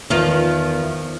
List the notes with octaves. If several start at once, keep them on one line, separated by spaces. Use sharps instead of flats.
E2 D#3 F3 F4